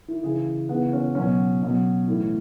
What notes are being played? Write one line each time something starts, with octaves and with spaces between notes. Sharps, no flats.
E4
C#3 E3 G#4
C#3 E3 B3
C#4
B2 F#3 C#4
B2 F#3
A2 E3